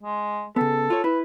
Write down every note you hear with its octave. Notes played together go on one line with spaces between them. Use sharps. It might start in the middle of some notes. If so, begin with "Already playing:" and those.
G#3
C#3 B3 A4
F4 C#5
E4 B4